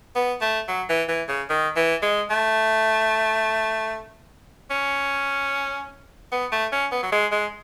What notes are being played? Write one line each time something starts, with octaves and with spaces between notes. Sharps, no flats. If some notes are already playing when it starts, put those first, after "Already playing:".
B3
A3
F#3
E3
E3
C#3
D#3
E3
G#3
A3
C#4
B3
A3
C#4
B3
F#3
G#3
G#3